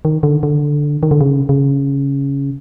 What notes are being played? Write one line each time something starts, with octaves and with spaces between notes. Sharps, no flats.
D#3
D3
D3
D#3
D3
C#3
C#3